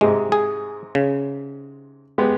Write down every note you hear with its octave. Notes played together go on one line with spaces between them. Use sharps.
G#2 C3 G#3
G#4
C#3
G#3 B3 G4